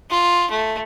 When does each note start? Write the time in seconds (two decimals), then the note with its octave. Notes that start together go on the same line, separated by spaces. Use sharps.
0.11 F4
0.51 A3